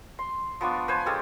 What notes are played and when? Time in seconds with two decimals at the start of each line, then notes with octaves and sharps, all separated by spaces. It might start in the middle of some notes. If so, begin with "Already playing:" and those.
0.19 C6
0.61 F3 B3 D4 C#6
0.88 B4 C5 G#5
1.06 G#3 C#4 G4 A4